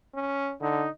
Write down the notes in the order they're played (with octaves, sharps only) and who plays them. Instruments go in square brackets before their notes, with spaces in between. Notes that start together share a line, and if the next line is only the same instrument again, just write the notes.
[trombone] C#4
[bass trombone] D3 [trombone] D#4